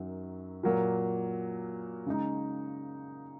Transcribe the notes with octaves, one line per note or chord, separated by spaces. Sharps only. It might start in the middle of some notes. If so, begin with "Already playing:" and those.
Already playing: F#2 D#3 F#3
A#2 F#3 A#3
C#3 G#3 D#4